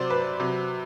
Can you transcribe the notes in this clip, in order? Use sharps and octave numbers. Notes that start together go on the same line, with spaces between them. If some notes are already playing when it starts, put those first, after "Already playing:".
Already playing: C3 F#3 C5 D5
B4
C3 F#3